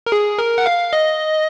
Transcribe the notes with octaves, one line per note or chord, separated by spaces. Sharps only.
A#4
G#4
A#4
F#5
F5
D#5